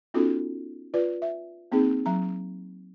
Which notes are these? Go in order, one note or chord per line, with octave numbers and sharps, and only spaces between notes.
B3 C#4 D#4 F4 F#4 A4
F4 B4 D5
E5
A#3 C4 D#4 G#4
F#3 A#5